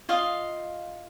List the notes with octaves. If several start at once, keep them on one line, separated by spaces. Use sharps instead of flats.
F4 D#5 F5